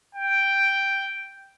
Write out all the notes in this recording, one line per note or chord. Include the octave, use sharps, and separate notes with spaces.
G5